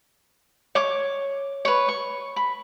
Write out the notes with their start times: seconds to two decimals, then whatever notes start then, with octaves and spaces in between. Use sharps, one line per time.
0.75 C#5 D6
1.65 B4 C#5
1.88 C#6
2.36 B5